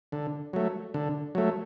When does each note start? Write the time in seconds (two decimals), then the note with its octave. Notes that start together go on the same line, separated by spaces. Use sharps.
0.12 D3
0.53 F#3 A3
0.94 D3
1.35 F#3 A3